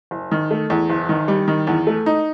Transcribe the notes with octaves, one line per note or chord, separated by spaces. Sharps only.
F#1
D#3
A3
E2
F#1
D#3
G3
D#3
E2
A3
D#4